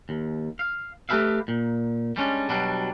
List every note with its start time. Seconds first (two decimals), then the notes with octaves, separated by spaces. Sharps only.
0.09 D#2
0.59 F5
1.09 A3 G4 G#4 B4 E5 F5
1.48 A#2
2.16 G3 G#3 C#4 D4
2.49 B2 F#3 G3 D4